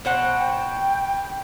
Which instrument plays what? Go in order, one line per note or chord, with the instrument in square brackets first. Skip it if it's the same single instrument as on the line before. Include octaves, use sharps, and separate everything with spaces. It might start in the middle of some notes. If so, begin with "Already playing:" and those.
[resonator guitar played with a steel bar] B2 C5 F#5
[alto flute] G5